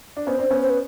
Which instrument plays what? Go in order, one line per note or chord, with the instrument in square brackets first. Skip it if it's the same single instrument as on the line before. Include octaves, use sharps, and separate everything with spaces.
[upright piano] D4
[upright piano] B3 C#4 [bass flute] C5
[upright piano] C4 D4
B3 C#4
[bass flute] C5
B4